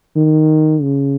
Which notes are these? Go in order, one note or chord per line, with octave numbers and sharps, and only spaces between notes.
D#3
C#3